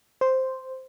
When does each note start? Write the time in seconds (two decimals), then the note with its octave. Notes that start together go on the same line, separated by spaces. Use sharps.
0.21 C5